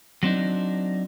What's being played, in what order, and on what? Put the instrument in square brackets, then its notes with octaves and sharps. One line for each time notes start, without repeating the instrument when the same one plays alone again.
[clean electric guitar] F#3 C4 D4 D#4